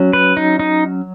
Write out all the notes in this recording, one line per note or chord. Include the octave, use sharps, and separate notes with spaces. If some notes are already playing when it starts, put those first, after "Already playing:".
Already playing: F#3 C#4
B4
D#4
D#4